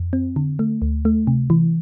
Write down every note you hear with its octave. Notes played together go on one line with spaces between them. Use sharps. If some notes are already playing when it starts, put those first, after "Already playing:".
Already playing: F2
C4
D3
A3
D2
A3
C3
E3